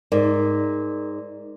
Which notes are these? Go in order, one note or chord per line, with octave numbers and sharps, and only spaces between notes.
G#2 A#4 D5